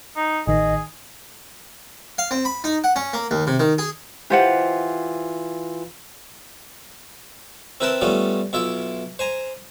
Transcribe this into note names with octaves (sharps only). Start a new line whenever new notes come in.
D#4
A1 D#3 G#4 D#5
F5
C4
B5
D#4
F#5
C#4
A#3
D#2
C3
D#3
G#4
E3 F4 G4 C5 F#5
C4 E4 A#4 B4 G5 A5
G3 A3 B3 C#4 F4
B1 E4 F4 E5
C5 G#5 A#5